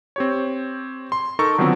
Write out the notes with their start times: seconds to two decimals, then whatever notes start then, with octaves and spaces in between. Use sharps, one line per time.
0.16 C4 G4 C#5
1.12 C6
1.39 D#4 A4 A#4 A#5 C#6
1.58 D3 D#3 F3 F#3 B3 C4